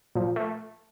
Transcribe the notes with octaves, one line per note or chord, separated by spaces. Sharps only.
A#2 F3
A3